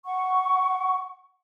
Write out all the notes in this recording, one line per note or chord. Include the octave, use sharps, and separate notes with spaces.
F#5 C#6